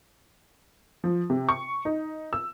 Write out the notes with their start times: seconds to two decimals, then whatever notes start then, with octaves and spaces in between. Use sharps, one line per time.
1.04 F3
1.30 C3
1.49 C#6
1.85 D#4
2.33 E6